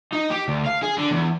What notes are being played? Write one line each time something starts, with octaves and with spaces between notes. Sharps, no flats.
D#4
G4
D2
F5
G#4
D3
E2